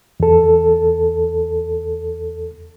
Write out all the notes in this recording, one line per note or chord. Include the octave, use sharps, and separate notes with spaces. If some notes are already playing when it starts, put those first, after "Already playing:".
E2 A4